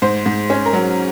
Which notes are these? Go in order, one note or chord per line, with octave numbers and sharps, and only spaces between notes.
G#2 C5
G#2
C#4
A#4
F#3